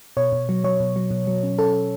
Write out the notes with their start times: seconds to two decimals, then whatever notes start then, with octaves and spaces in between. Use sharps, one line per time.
0.17 B2 C#5
0.32 B2
0.49 F#3
0.64 F#3 C#5
0.80 B2
0.96 F#3
1.10 B2
1.27 F#3
1.43 C#4
1.58 C#4 A4